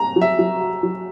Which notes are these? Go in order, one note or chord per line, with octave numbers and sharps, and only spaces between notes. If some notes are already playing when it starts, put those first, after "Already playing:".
Already playing: A#5
F#3
E5
F#3
F#4
F#3